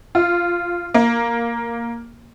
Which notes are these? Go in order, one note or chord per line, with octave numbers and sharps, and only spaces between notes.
F4
A#3